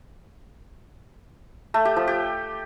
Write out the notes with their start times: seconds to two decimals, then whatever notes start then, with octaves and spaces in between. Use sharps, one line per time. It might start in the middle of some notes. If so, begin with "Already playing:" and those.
1.74 A3
1.85 G4
1.96 F3
2.08 G4